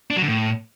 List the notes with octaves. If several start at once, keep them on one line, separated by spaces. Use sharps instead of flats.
D4
F#3
D3
A2